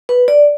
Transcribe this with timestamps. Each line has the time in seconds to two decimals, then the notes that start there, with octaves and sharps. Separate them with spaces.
0.09 B4
0.28 D5